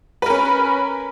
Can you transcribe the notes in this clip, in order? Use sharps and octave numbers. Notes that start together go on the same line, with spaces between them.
C#4 A#4 B4